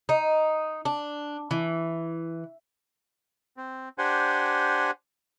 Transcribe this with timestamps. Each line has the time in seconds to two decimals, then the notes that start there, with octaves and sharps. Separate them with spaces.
0.09 D#4
0.85 D4
1.51 E3
3.57 C4
3.98 D4 G4 C5 F#5 G#5